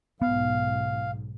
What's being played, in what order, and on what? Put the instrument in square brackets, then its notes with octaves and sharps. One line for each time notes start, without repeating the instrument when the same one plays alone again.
[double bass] B1 G#2 [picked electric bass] B3 [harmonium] F5